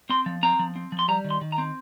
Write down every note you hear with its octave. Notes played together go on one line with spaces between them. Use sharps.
C4 C6
F3
C4 A#5
F3
C4
F3
C6
G3 A#5
D#3
C6
D#3
A#5
C4